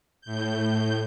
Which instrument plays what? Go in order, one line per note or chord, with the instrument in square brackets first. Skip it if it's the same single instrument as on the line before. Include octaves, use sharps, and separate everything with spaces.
[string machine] A2 G6